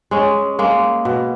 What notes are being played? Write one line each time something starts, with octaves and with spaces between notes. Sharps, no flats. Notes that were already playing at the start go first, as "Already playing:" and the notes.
G#3 C#4
G#3 A#3
B2